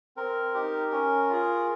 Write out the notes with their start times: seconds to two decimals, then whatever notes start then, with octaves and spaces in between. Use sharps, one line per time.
0.17 C4 A#4
0.54 D#4 G4
0.92 C#4
1.30 F4 G#4